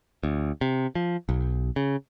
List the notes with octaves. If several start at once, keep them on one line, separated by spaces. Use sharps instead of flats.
D2
C3
F3
B1
C#3